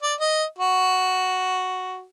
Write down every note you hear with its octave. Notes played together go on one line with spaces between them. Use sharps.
D5
D#5
F#4